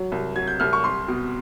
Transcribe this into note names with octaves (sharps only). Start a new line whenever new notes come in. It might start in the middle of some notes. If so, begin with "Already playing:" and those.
Already playing: F#3
C2
F#3 G#6
G6
C2 F6
C#6
C2 C6
B2